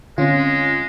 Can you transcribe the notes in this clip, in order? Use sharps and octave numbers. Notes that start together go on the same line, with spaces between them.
D3 G#3 C4 C#4 F4